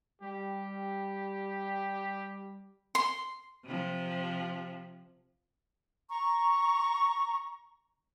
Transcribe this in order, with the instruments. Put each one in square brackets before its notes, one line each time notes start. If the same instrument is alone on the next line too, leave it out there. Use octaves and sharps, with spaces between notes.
[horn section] G3 [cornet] G4
[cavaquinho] C6
[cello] C3 F3
[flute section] A#5 C#6